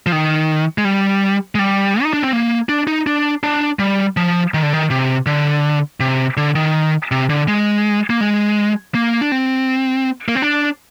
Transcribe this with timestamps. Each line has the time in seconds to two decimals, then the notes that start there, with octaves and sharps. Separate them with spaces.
0.06 F3
0.12 D#3
0.78 G#3
0.85 G3
1.55 G#3
1.59 G3
2.03 D#4
2.13 D4
2.23 C4
2.33 A#3
2.69 D4
2.87 D#4
3.07 D4
3.43 D4
3.79 G3
4.17 F3
4.54 D#3
4.63 D3
4.73 D#3
4.90 C3
5.26 D3
6.00 C3
6.37 D3
6.55 D#3
7.11 C3
7.29 D3
7.48 G#3
8.10 A#3
8.21 G#3
8.95 A#3
9.21 D4
9.32 C4
10.28 A#3
10.35 C4
10.42 D4